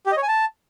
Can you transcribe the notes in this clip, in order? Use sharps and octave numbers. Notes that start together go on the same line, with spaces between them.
G4
D#5
C#5
G#5
A5